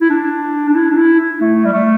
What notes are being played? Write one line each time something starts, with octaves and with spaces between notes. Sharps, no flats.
E4
D4
D4
E4
D4
E4
E4
A3
G3
A3